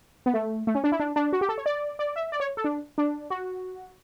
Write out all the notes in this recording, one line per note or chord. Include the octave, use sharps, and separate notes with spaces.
B3
A3
A3
C#4
D4
E4
D4
D4
F#4
G4
A4
C#5
D5
D5
E5
D5
C#5
A4
D4
D4
F#4